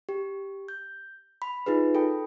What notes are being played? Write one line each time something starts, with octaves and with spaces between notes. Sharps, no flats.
G4
G6
B5
D#4 F4 G#4 B4
A4 G5 B5